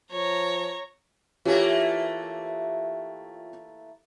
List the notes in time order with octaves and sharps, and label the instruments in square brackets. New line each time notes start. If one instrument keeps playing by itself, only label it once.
[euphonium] F3 [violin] C#5 A#5
[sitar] E3 A3 A#3 [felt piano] F4 G4 C#5